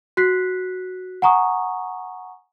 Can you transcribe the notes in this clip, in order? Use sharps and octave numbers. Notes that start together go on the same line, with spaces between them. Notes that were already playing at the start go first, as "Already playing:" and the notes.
F#4 F#6 B6 C7
F#5 G#5 A#5 C#6 D#6